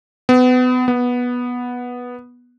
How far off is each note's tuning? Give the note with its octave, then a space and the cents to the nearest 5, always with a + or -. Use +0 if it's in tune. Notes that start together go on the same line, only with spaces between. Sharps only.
B3 +30
B3 -10